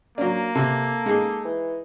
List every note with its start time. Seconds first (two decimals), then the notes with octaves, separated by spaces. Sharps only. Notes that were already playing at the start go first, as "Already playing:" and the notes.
0.18 F#3 A#3 D4
0.55 C3 A4
1.06 G#3 D#4 G#4
1.45 E3